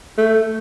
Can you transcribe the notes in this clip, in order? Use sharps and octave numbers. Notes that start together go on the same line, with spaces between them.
A3